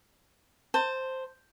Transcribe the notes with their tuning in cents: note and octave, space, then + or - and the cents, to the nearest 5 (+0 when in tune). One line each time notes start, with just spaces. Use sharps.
C5 +0 A5 +25